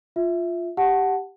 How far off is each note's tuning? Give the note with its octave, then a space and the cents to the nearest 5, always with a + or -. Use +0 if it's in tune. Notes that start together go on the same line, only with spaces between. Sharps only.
F4 +0 E5 +0
G4 +0 F#5 +0 A5 +0